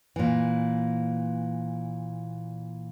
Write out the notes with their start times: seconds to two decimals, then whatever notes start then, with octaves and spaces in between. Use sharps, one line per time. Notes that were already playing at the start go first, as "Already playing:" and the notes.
0.16 A#2 E3